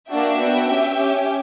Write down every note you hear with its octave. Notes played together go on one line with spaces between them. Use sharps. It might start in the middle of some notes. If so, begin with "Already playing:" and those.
A#3 D4 F#4 E5 G5
B3 F#4
C#4 G4
C#4 G4